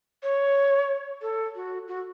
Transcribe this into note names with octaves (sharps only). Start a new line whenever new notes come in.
C#5
A4
F#4
F#4